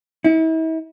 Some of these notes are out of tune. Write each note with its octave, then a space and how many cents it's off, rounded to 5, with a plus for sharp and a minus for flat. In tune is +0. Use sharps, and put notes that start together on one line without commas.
E4 -40